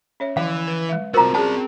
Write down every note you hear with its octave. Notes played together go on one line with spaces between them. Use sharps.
C#4 C#5 E5
D3 E3 F3 F5
B4
G#3 E5
C2 C4 F4 F#4 A#4 C5 A#5
C4 C#4 F#4 G#4 D5 A5